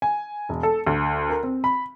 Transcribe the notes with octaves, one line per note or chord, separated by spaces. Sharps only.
G#5
E1
A4
D2
A#4
C4
B5